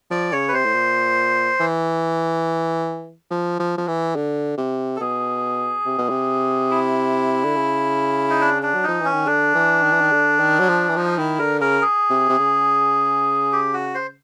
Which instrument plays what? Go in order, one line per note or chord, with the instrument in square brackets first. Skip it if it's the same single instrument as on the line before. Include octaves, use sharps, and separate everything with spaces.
[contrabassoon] F3 [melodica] D5
[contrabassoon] C#3 [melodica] C#5
[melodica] B4
[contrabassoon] C3 [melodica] C5
[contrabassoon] A2
A#2
E3
F3
F3
F3
E3
D3
C3
[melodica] A4
[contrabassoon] B2 [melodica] G#4
[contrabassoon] C3
B2
C3
[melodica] E4
[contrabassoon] D3
C#3
[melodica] D#4
D4
D4
[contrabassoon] F#3
[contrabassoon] F3 [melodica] D#4
[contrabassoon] E3 [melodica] C#4
[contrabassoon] D#3
[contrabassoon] D3 [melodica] D4
[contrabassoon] E3
D#3
E3
D#3
D3
D#3
F#3
F3
E3
[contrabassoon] F3 [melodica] D#4
[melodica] F4
[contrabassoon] D#3 [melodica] E4
[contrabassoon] D3 [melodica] A#4
[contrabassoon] C#3 [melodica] A#4
[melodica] G#4
[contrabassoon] C3
C3
C#3
[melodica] G4
F#4
C5